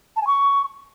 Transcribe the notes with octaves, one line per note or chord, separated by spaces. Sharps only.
A5
G#5
C#6